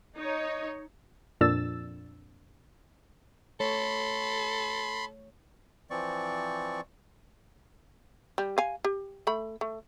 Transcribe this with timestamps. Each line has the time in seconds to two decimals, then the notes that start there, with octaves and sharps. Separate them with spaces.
0.17 D#4 C#5
1.41 F2 A#2 D4 E6 A6
3.60 A3 A4 C#5 B5 C6
5.90 E3 F3 C4 D5 C#6
8.38 G3
8.58 F5 G#5
8.85 G4
9.27 A3 B5
9.61 A3